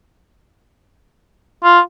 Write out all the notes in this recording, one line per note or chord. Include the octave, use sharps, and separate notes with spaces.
F4